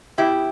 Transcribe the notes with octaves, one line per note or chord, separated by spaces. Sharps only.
B2 E4 G4